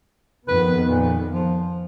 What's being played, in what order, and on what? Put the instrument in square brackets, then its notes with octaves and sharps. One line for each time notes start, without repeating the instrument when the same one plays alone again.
[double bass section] F2 D#3 B3 [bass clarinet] B4
[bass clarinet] A#2
F3